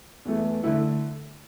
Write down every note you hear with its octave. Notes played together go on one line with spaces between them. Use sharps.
E2 E3 A3
D3 A3 E4